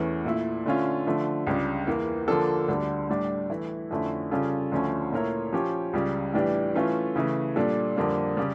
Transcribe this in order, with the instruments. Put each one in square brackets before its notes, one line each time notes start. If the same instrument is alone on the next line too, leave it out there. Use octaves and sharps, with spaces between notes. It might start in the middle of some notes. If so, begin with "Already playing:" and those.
Already playing: [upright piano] E2 E3 A3 C#4
A#2 A3 E4
D3 A3 C#4 F4
D3 F3 A3
C#2 C#3 G3 D4
E2 E3 A#3
D3 F3 A#3 D4 A4
D2 D3 G3
A2 G3 D4
E3 A3 E4
F2 D3 A3 C#4 E4
C#3 G3 C#4 F4 A4
D2 D3 F3 A3 C#4
A#2 A3 E4 A#4 C#5
F3 C#4 G4 C#5
C#2 C#3 G3
A2 E3 G3 D4 G4
E3 A3 C#4 F4 A4
C#3 E3 A3
A#2 G3 D4 A4
F2 D3 G3 A#3
C#3 G3